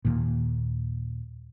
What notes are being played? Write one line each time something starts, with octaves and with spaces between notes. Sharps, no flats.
D#2 A#2